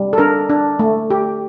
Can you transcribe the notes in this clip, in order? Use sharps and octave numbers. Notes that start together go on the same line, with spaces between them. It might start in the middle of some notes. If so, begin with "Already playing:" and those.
Already playing: G3
A4
D4 A#4
D4
A3
G4